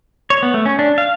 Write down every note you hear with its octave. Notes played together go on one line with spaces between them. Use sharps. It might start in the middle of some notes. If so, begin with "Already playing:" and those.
C#5
B3
A3
C#4
D4
F5